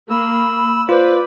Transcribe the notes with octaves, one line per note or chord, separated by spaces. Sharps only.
A#3 B5 E6
F4 B4 C5 D5